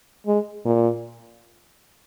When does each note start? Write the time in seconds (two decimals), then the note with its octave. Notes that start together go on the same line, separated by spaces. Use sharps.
0.27 G#3
0.65 A#2